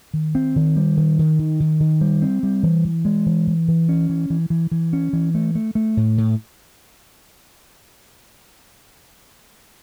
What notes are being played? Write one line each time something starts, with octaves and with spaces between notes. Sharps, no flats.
D#3
C4
D#3
G3
D#3
D#3
D#3
D#3
D#3
G3
C4
G3
E3
E3
G#3
E3
E3
E3
C#4
E3
E3
E3
E3
C#4
E3
A3
A3
A3
A2
A2